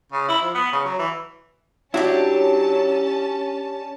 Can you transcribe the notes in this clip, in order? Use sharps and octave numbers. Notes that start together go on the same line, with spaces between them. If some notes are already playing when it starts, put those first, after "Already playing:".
C#3
E4
F3
B3
C#3
F#3
E3
F#3 C#4 D4 E4 F#4 G4 A5